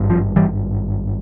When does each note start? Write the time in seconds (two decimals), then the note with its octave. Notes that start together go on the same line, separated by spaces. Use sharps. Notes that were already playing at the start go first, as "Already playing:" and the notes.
Already playing: G#1 G2
0.10 F3
0.36 E3 G3